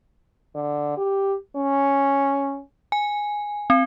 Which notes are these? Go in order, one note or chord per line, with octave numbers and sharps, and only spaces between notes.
D3
G4
C#4
G#5
C4